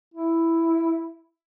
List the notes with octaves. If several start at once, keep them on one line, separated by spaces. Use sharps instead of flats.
E4